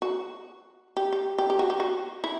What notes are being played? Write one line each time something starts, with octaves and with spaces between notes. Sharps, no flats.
F#4
G4
G4
G4
G4
F#4
G4
F#4
E4